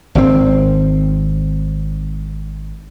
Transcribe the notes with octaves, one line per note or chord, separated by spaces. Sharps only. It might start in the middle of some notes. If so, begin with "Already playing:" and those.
G#1 D3 C4